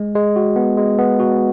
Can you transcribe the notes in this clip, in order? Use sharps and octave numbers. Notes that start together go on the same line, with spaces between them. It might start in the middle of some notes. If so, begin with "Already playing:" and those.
Already playing: G#3
G#3
F#4
B3
G#3
B3
F#4